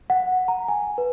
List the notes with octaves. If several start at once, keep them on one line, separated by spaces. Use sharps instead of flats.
F#5
A#5
G#5
B4